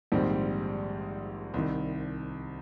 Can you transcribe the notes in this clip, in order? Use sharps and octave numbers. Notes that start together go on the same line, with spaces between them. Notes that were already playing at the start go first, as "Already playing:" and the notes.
A#1 G#2 D#3 G3 C4
C2 C3 D#3